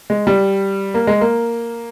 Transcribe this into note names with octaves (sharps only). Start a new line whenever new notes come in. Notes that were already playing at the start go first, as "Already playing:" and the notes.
G#3
G3
A#3
G#3
A#3